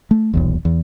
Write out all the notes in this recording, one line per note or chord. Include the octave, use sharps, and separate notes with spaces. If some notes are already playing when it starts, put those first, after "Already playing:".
A3
D#1 B1 E2
E2